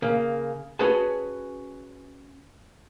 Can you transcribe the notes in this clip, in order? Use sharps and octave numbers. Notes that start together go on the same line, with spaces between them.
C#3 A#3
C#4 F#4 G#4 B4 A5